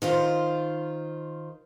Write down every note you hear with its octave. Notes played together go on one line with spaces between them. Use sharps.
D#3 F4 C5